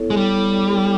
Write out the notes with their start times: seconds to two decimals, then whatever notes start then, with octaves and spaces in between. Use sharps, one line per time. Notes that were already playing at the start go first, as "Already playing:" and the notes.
Already playing: B3 E4 A4 C#5
0.10 G#3
0.17 G3